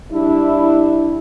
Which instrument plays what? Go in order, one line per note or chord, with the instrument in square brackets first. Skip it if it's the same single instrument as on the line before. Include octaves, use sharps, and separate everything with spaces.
[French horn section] G3 D4 E4